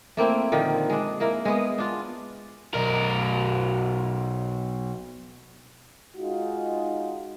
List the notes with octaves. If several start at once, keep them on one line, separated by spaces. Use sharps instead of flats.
A3 A#3 C4 E4
A#2 D3 D#3 F3
G#3 D4
A#3 E4 A#4
G#3 B3
D4 F4
B1 A#4
G#3 D#4 F4 F#4